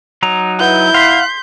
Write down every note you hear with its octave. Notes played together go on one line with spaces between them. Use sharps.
F#3 D#4 A#5
E4 B4 F#5 G6
F5 F#5 C6 B6 C7